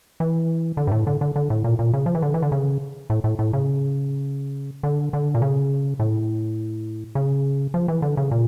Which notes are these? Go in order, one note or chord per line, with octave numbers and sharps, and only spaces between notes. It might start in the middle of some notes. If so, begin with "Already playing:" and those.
E3
D3
G2
A2
D3
D3
D3
A2
A#2
A#2
C#3
F3
E3
D3
E3
D3
C#3
A2
A2
A2
C#3
D3
D3
A#2
C#3
A2
C#3
F3
E3
D3
C#3
A#2